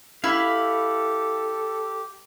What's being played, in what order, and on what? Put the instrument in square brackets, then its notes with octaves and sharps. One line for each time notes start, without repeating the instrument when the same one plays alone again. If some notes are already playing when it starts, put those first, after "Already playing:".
[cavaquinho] E4 [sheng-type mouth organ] G4 [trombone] A4 [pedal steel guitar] F5 B5